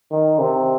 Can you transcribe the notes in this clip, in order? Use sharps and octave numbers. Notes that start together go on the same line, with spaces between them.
D#3
C3